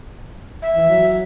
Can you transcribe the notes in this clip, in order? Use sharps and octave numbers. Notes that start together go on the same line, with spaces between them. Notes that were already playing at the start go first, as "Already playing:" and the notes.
E5
E3
F#3